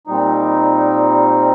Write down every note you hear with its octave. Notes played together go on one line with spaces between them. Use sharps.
A#2 G3 C4 D#4